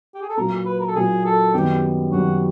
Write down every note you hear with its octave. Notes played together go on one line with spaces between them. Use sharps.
G4
G#4
A4
A#2 F#3 A#3 A#4
B4
A#4
A4
A#2 F#3 A#3 G#4
A4
F#2 D#3 G3 B3 G4
F#2 D#3 G3 B3 F#4